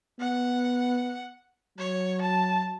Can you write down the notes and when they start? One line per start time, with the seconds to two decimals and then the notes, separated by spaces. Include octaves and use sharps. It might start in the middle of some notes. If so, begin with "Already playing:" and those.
0.20 B3 F#5
1.78 F#3 C#5
2.21 A5